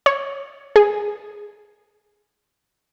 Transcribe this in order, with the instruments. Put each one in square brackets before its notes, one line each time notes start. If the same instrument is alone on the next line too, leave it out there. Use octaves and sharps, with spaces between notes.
[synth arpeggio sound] C#5
G#4